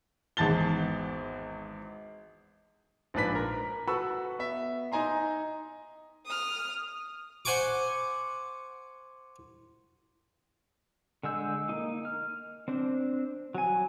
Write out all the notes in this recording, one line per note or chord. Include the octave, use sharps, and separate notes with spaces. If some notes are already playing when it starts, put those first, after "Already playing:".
G#1 E2 A5 A6 G7
A#1 G#2 D4 B4 B6
A#4
F#4 A4 B4 B5 C#6 E6
B3 E5
D#4 D#5 G#5 A#5 C6
D#6 F6
C5 F#5 G#5 C#6 D6
D3 G#3 E6 G6
A#3 D#4
F6
C4 D4 C5
F#3 G#5